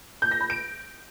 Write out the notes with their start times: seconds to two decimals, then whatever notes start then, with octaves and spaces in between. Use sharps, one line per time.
0.22 G6
0.31 A#6
0.41 B5
0.50 D7